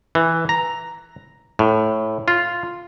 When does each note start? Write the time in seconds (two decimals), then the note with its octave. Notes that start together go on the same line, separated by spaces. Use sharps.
0.15 E3
0.49 A#5
1.59 A2
2.28 F4